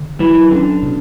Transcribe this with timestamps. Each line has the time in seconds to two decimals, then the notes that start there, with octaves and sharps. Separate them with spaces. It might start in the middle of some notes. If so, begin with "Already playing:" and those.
Already playing: D3
0.20 E3 F#3
0.51 D3 C#4
0.83 B2